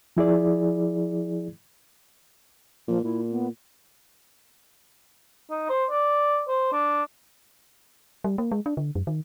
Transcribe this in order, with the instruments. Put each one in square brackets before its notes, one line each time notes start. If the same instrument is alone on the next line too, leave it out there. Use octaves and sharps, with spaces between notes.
[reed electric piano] F3 E4 G#4 D5
[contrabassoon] A#2 [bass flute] F3
[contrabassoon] A#2 [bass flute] E4
[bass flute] B3
[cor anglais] D#4
C5
D5
C5
D4
[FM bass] G3
A#3
G#3
D4
D3
F#2
D#3